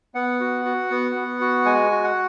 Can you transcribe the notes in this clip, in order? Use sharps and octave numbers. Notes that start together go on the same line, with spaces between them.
B3 F#5
F#4
F#4
B3
B3
F#4
G#3 G#5
F#4
F#5